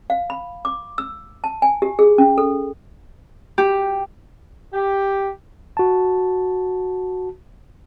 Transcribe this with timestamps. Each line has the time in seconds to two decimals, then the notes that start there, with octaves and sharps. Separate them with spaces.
0.10 F5
0.30 B5
0.65 D6
0.98 E6
1.44 A5
1.62 G#5
1.82 G4
1.99 G#4
2.18 C#4
2.38 A4
3.58 G4
4.73 G4
5.77 F#4 A5